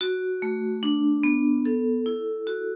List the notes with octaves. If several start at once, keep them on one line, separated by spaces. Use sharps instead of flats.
F#4
A3
D4
B3
A4
E4
F#4